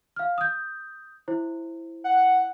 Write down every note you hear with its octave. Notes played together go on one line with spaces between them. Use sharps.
F5 F6
D#6 G6
E4 C5
F#5